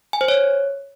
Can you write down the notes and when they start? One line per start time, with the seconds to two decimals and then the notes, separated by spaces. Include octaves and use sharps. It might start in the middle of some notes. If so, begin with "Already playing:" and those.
0.13 G#5
0.21 C5
0.28 C#5